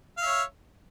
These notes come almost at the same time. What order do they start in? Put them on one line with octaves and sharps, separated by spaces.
F5 E5 C#5